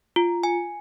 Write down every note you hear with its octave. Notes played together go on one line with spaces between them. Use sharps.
F4
G#5